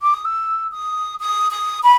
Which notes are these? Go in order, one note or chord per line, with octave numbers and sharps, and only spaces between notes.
D6
D#6
E6
D#6
D#6
D#6
B5